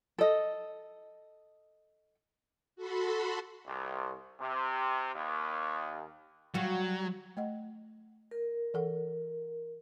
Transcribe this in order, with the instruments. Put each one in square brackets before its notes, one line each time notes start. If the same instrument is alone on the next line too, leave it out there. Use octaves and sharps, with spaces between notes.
[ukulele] A4 D#5
[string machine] F#4 A4 B5 C6
[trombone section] C2
C3
D#2
[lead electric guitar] F#3 [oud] G3 F#4
[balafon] A3 D#5 F#5
[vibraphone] A#4
[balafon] E3 A4 F#5